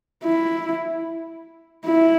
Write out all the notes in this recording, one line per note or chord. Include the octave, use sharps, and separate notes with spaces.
E4
E4